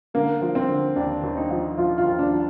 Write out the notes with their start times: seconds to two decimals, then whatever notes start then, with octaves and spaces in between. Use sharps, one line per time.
0.14 D3 A#3
0.41 F3
0.55 C4
0.69 D3
0.96 D#2 D4
1.23 D#2
1.37 D#4
1.50 F3
1.77 F3 F4
1.98 F4
2.05 D#2
2.19 D4
2.32 F3